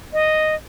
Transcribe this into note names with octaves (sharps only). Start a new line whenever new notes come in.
D#5